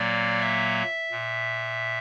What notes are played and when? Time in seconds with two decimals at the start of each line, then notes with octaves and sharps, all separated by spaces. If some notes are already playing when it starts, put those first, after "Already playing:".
Already playing: A#2 F#3 A#3 D5
0.40 E5
1.11 A#2